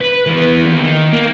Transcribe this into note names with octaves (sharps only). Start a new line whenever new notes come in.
B4
E3 B3
D#2
D#3
A#3